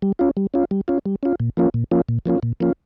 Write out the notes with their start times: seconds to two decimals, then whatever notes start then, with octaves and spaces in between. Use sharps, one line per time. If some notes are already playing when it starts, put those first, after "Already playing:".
0.02 G3
0.19 C#4 F4
0.37 G3
0.54 C#4 F4
0.71 G3
0.88 C#4 F4
1.06 G3
1.23 C#4 F4
1.40 A#2
1.57 F3 A#3 C#4 F4
1.74 A#2
1.91 F3 A#3 C#4 F4
2.09 A#2
2.26 F3 A#3 C#4 F4
2.43 A#2
2.60 F3 A#3 C#4 F4